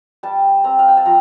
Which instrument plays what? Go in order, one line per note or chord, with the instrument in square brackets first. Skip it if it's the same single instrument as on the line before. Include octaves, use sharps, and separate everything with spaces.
[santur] G3 A5
C4 A#5
F5
G5
A5
F3 A#5